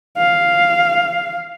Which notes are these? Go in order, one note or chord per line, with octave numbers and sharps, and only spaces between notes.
F5